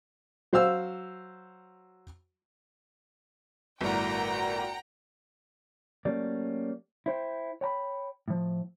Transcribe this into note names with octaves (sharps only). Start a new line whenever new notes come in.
F#3 C5 F5 E6
G1 A2 F#4 A#4 D5 F#5 G5 A#5
F#3 A3 A#3 C#4 G4 D5
E4 C5 G5
C#5 G5 A#5 B5
A2 F3